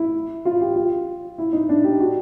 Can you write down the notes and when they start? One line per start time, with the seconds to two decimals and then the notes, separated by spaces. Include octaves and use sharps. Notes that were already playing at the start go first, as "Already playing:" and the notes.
Already playing: E4
0.45 F4
0.61 G4
0.76 F4
1.38 E4
1.53 D#4
1.69 D4
1.84 G4
2.00 F#4